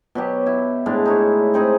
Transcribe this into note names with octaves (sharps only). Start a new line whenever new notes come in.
B2 F#3 G4
E4
A2 G#3 D4 F5
D#4 E4 C#5
C4 D#4 G#4 E5